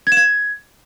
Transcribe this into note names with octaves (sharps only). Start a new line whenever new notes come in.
G#6
E7
G#6